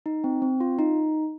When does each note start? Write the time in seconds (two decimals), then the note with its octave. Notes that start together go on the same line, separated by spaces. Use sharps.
0.06 D#4
0.24 C4
0.42 C4
0.60 F4
0.79 D#4